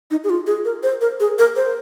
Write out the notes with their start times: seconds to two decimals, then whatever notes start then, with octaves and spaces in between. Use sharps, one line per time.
0.11 D#4
0.24 G#4
0.30 F4
0.47 G#4
0.65 A#4
0.83 C5
1.01 A#4
1.20 G#4
1.39 A#4
1.56 C5